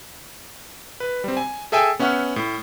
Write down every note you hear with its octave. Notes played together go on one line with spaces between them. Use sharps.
B4
G3 C4
G#5
G#4 A4 E5 G5 G#5
B3 C#4 E5 F#5 C#6 F6
A2